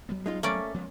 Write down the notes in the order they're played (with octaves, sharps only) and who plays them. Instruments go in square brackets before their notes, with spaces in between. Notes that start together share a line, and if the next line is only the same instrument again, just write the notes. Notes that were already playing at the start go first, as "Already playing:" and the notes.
[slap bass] F#3 G3 B3
[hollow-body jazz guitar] G#3 D#4 F4
[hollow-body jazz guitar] A3 [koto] A#3 C#4 D5
[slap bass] F3 G#3 B3